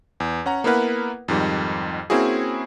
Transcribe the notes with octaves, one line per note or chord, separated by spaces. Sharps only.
E2
C#4 F#5 A#5
A#3 B3 E4 A#4 B4 F#5
F2 G#2 D#3 G3
A#3 C4 C#4 E4 F#4 G#4